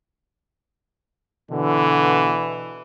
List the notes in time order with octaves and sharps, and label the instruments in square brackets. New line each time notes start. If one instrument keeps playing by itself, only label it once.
[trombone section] B2 D3 [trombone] E3